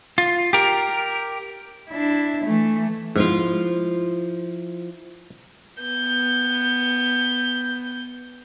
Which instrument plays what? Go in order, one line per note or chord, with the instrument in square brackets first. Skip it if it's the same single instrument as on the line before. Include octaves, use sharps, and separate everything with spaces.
[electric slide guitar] F4
G4 A#4
[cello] D4 E4
E3 A3
[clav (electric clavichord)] G#2 [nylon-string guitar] F3 E4 F4
[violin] B3 G6